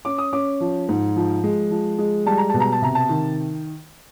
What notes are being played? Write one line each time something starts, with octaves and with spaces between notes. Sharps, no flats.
C#4 D6
D#6
C#4 D6
F3
G#2
F3
G#3
F3
G#3
G3 A5
A#5
B2 A5
A#5
A5
C3 A#5
A5
D#3